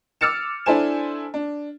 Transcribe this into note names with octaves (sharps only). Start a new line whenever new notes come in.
D6 E6 F6 A6 C#7 E7
D4 E4 A4 C5 G#5 E7
D4